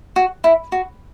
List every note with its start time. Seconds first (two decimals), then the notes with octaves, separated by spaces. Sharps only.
0.16 F#4
0.44 E4
0.72 F#4